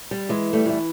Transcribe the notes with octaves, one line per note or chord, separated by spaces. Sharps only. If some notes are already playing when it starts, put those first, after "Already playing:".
G3
E3 G#3
G3 A3
E3 A3